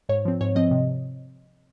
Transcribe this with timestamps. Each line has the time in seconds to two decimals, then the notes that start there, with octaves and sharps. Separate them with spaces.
0.09 G#2 C#5
0.25 F3 C4
0.41 G#2 C#5
0.55 F3 C4 D#5
0.71 C3